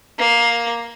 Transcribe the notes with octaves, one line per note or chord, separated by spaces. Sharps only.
A#3